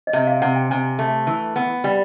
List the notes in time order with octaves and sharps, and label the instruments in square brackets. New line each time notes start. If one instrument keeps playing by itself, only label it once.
[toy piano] D#5
[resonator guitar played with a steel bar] C3 [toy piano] E5
[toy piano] F5
[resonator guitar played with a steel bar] C3 [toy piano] F#5
[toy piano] G5
[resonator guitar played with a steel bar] C3 [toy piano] G#5
[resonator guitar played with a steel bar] A3
E3
B3
[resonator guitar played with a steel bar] G3 [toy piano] G5